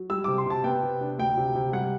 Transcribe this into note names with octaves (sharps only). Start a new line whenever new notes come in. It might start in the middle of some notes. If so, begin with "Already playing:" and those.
Already playing: F#3
G3 E6
C3 D6
C6
C3 A5
B3 G5
C3
D4
D2 G5
C3
C3
G3 F#5